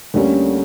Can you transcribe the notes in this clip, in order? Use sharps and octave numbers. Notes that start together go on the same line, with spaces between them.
D2 D3 G3 A#3 C#4